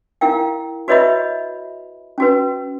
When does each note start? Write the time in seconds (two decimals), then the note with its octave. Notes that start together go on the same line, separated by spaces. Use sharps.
0.21 E4 A#4 F5 G5
0.88 F#4 B4 C#5 D#5 E5 B5
2.18 C#4 F#4 B4